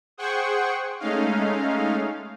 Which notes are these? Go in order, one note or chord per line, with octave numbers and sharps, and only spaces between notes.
G#4 C5 F#5 G5 C#6
G#3 A3 C#4 D#4 F5